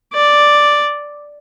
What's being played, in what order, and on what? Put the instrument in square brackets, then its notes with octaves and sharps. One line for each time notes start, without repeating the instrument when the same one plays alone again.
[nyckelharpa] D5